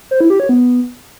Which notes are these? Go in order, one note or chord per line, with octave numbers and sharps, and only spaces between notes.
C5
E4
G4
C#5
B3